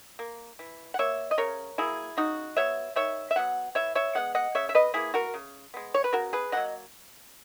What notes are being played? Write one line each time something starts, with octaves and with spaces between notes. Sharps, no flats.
A#3
E3
F#5
A#3 C#5 E5
D#5
C#3 A#4 C#5
F#3 A#3 E4 G#4
C#3 D#4 F#4
F#3 B3 C#5 E5
D#3 C#5 E5
E5
F#3 B3 F#5
E3 C#5 E5
C#5 E5
G#3 B3 F#5
D#5 F#5
C#3 C#5 E5
E5
B4 D#5
E3 A#3 E4 G#4
F#4 A#4
C#3
G#3 B3
C#5
B4
C#3 F#4 A#4
G#4 B4
F#3 A#3 D#5 F#5